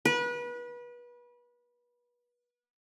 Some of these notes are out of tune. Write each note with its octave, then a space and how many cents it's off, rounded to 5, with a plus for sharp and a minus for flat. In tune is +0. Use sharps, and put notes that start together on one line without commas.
B4 -30